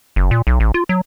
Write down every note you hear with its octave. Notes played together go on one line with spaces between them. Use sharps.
F#1
A#2
B1
A1
F4
F#3